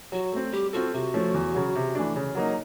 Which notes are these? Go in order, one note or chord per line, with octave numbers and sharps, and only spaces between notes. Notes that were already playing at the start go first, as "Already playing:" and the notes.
F#3 F#4
A3 C4
G3 G4
C4 F4 F#4 A4
C3 F#4
F3 A3 C#4
E2
C#3 F#3
C3
E3 A3 D4
C#3
F#3 A#3 D#4